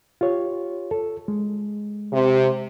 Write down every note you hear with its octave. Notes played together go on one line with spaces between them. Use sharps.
F4 G4 C#5
A4
G#3
C3